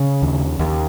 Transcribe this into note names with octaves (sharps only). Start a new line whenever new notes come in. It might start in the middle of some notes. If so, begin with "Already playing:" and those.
Already playing: C#3 C#4
D#2
D#2